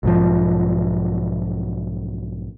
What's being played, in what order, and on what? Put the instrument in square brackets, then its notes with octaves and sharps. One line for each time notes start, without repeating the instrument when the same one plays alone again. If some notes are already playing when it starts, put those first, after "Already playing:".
[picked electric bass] B1 G#2 F3